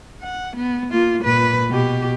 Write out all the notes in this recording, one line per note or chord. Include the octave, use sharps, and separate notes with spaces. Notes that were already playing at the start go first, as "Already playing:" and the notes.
F#5
B3
A#3 F4
A#2 B4
B2 G4